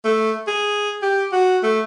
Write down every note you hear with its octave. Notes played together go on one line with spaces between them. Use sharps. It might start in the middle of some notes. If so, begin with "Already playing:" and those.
A3
G#4
G4
F#4
A3